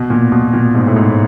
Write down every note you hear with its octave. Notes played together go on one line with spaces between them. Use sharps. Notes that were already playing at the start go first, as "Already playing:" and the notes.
Already playing: B2
A#2
B2
A#2
G#2
A2
G#2